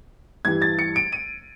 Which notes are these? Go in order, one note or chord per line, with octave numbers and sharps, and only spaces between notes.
G2 E3 G3 G#6
A6
C#7
D7
D#7